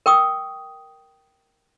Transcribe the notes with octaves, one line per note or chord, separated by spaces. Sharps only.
A#4 G5 C#6 D#6